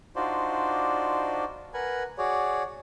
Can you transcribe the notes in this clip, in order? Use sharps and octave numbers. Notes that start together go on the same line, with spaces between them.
D4 D#4 F4 F#4 C5 D5
A#4 B4 F#5 G#5
F#4 G#4 C#5 D5